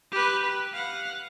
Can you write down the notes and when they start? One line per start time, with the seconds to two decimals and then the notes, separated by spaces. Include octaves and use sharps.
0.12 G4 B4
0.43 B4
0.73 F5 F#5